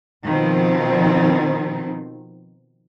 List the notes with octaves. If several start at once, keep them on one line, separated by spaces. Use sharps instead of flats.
B2 D#3 F3 C4